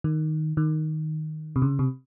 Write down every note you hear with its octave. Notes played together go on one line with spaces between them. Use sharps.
D#3
D#3
C3
C#3
C3